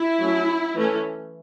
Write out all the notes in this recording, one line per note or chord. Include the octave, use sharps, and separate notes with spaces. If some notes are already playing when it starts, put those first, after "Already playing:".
Already playing: E4
F#3 A3 C#4
E3 A3 C#4